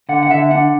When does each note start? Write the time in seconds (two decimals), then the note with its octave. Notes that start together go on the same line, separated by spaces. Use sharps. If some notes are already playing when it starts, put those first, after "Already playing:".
0.09 D3 F#5
0.23 F#5
0.30 D3 E5
0.51 D4 F#5